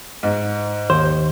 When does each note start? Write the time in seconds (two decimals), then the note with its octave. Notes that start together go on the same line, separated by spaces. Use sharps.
0.23 G#2
0.90 D#2 C5